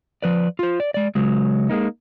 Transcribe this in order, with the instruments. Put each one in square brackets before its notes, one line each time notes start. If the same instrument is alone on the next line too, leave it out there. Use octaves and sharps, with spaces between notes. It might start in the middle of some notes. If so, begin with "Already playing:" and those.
[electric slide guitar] F3 B4 D5
F4 C5
D5
G#3 D5
C#3 F#3 G#3
G#3 A#3 D#4